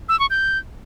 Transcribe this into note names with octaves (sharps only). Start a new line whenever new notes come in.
E6
C#6
G6